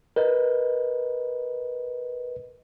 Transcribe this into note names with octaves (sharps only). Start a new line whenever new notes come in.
A#4 B4 D#5